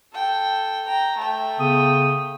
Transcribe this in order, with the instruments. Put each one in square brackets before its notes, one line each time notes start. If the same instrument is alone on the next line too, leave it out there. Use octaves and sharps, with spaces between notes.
[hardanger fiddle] A4 G5
G5 A#5
A3 G5
[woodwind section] C#3 B3 D#6